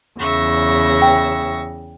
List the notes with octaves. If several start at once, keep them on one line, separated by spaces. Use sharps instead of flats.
E2 C#3 E5 C#6 A#6
G5